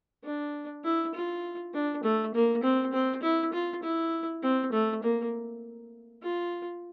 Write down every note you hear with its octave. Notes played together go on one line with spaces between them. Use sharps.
D4
E4
F4
D4
A3
A#3
C4
C4
E4
F4
E4
C4
A3
A#3
F4